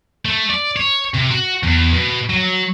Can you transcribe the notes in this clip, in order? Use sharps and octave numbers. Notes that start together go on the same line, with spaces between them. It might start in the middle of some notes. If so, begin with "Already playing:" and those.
A3
D5
C#5
C3
F#4
E2
B2
F#3